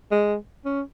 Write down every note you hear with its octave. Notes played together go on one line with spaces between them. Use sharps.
G#3
C#4